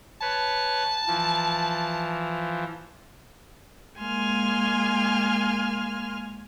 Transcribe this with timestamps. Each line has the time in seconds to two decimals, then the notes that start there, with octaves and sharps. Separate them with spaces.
0.21 B4 C#5 A5
1.07 E3 F3
3.99 G#3 A#3 G#5 C6 F6